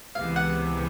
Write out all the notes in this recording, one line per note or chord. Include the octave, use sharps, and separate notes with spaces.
C#2 C3 E3 G#3 B3 F5
F#5